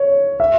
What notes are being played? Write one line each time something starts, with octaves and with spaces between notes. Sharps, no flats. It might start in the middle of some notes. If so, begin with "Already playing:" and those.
Already playing: C#5
E5